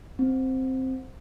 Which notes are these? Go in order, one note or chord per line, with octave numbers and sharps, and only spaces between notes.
C4